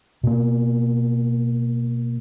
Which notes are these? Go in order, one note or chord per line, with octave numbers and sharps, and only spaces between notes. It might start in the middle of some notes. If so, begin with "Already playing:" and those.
B2 A#3